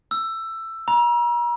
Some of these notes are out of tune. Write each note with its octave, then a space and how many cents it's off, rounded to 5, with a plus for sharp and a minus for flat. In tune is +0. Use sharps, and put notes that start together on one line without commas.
E6 +15
A#5 +40